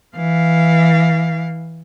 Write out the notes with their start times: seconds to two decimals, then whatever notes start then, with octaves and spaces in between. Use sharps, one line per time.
0.16 E3 F5